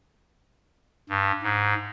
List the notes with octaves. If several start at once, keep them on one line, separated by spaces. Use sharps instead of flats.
G2
G#2